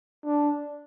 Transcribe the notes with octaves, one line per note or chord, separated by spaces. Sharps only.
D4